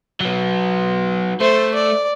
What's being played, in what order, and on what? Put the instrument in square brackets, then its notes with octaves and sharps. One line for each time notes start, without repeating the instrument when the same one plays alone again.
[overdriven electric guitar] F#3 B3
[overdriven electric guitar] A3 [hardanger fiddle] C5
[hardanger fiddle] D5